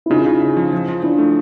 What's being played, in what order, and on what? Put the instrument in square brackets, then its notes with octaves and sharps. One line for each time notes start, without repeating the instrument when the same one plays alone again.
[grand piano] E4
[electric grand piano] C#3 [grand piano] D#4 F4
[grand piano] E4
D#4 F4
[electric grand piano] C#3
C#3
F3
F3
F3
[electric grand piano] F3 [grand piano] D4 E4
[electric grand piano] A3